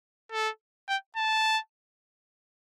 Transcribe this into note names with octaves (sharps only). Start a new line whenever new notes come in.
A4
G5
A5